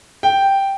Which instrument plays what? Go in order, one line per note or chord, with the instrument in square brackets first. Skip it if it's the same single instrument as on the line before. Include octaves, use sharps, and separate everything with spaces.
[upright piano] G5